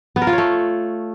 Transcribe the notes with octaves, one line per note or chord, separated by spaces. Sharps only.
B3
A#4
F4
C#5
A3